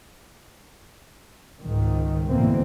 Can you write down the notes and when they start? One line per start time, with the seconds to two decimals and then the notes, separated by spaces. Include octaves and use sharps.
1.63 C#2 G#2 D#3
2.30 D2 G#2 B2 E3 A#3 C4